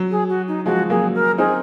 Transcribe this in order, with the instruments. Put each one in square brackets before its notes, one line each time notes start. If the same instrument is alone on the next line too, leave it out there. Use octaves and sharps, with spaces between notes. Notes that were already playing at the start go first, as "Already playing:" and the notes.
Already playing: [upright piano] F#3
[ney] G#4
F#4
D#4
[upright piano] F3 G#3 [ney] F#4
[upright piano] F#3 A#3 [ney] G#4
[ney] A#4
[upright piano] C4 D#4 [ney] G#4